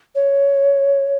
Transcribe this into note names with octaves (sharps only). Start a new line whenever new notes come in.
C#5